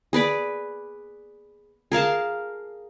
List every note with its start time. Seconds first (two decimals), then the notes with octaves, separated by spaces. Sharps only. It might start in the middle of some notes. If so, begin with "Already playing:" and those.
0.13 G#4 B4 D5
1.92 G#4 A#4 F5 A5